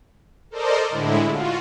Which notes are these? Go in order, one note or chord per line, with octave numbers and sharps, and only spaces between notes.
A4 A#4 C5 D5 D#5
A2 D3 G#3 E4
F4 F#4